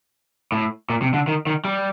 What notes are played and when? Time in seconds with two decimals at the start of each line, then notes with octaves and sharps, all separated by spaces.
0.52 A2
0.90 A#2
1.02 C3
1.14 D3
1.28 D#3
1.47 D#3
1.65 G3